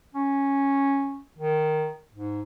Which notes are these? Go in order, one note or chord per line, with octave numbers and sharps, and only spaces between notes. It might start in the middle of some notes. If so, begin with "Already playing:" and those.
C#4
D#3
G#2